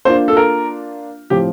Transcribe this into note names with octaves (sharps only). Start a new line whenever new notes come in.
A#3 D4 F4 C5
A4
A#4
A2 F3 C4 G4